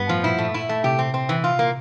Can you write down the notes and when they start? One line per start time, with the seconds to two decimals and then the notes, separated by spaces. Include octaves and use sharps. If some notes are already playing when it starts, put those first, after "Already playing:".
Already playing: G2 B3
0.09 A2 F3
0.24 A#2 E4
0.39 A3
0.54 E4
0.69 A3
0.84 C3 G4
0.99 C4
1.14 C4
1.29 E3
1.44 F4
1.59 A#3